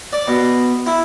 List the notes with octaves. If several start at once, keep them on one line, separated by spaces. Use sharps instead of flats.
D5
B2
E4